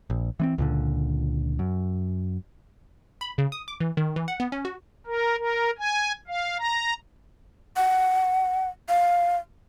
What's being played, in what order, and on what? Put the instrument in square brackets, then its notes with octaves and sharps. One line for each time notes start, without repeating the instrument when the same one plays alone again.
[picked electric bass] A#1
E3 B3 C4
C#2 A#2 D3
F#2
[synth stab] B5
C#3
D#6
D6
E3
D#3
E3
F#5
B3
C#4
F#4
[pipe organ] A#4
A#4
G#5
F5
A#5
[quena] F#5
F5